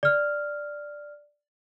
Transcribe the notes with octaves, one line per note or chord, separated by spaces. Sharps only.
D5 F6